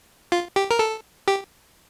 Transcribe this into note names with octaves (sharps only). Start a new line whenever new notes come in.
F4
G4
A#4
A4
G4